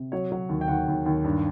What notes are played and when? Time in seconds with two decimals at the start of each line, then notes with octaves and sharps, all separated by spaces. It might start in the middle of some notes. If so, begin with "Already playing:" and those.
Already playing: C3
0.12 F#3 C#5
0.32 F#3
0.49 D#2
0.61 G5
0.68 D#2 F#5
0.88 D#2
1.06 D#2
1.24 G2